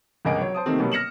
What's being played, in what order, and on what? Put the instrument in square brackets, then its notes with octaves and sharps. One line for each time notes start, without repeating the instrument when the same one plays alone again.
[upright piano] G1 C#2 A#4 D#5 G#5 D7
F#3 C#5
C5 A5 D#6
C3 D#3 A3 A#3 C4
B2 F#3 G3 A#3 B3
F6 A#6 C#7 E7 F#7